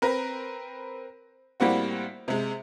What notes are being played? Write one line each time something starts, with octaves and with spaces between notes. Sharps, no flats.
C4 A#4 B4
A2 G3 A#3 C4 F#4
C3 G#3